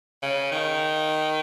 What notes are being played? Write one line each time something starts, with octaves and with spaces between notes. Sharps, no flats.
C#3
D#3